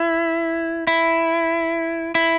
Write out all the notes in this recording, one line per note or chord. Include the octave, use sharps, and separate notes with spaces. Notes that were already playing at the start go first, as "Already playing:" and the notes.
Already playing: E4
E4
E4